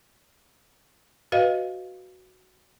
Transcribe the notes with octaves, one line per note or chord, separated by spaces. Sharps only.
F#4 B4 D#5 F5